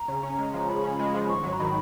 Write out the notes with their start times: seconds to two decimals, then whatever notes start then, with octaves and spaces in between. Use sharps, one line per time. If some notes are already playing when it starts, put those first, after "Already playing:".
Already playing: A#5
0.08 C#3
0.23 C#4
0.38 G#3
0.54 F3 A#5
0.69 C#3 B5
0.84 C#4
0.99 G#3
1.14 F3
1.29 G#1 C#6
1.44 F#3
1.53 A#5
1.59 D#3 B5